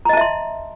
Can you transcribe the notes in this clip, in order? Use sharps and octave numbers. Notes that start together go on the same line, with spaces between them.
D#5 E5 A5 A#5 C6